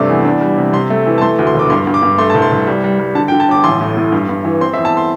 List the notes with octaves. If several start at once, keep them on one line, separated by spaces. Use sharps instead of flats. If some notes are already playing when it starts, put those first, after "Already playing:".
Already playing: G2 C3 A3 D5
E2
D4
G3
C3
C3 C6
A3
E3
A5
A3 C6
D2
C6
E1 D6
G2 C6
G2
D6
G2
A3 C6
C2 A5
C6
C2
G3
G3
G3
D3 A5
G5
D3
A5
G1 D6
A1 C6
A2
A2
G2
G2
E3
C4 C6
E5
E2
A5
C6